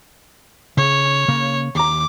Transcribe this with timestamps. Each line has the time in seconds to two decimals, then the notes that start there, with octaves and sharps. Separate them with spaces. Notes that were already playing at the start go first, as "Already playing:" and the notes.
0.77 C#3 C#5
1.28 C#3 A#3
1.75 D#2 A#5 D6